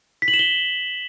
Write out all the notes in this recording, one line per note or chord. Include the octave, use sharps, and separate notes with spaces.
B6
F#7
E7
G7